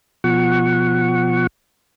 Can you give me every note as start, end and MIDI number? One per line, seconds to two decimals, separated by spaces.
0.24 1.47 47
0.24 1.47 53
0.24 1.47 78
0.24 1.47 85